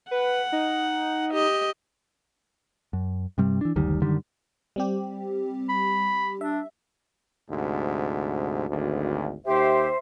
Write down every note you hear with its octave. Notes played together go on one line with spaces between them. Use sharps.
B4 F#5
D#4
G4 D#5
F#2
G2 C3 G3
E3 D4
F#1 D2 D#3 G3
F#2 D3 D#3 G3
G3 C4 G4
B5
D4 E5
D2 G#2 C3
G#1 D2
D#2 G4 C5 E5